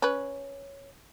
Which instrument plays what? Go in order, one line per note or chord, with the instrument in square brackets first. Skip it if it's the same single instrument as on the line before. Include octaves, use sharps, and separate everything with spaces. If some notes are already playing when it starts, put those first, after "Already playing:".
[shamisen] C#4 B4